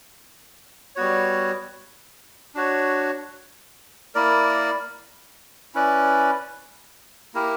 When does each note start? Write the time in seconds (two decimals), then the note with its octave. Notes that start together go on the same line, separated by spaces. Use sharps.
0.96 G3 B3 F#4 C#5
2.55 D4 F#4 C#5
4.15 A#3 E4 A#4 D5
5.75 C#4 E4 B4 D5
7.34 A#3 E4 G4 A#4